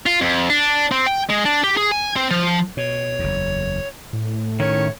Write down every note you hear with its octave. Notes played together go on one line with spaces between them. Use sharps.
F4
F2
D4
C4
G5
G#3
D4
G4
G#4
G#5
C4
F3
B2 C#5
F#1 E2
A2
D#3 C#4 C#5